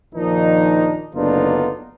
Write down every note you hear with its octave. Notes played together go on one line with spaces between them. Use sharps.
A#1 D#3 F3 D4 D#4
F#1 D3 B3 D4 D#4 F4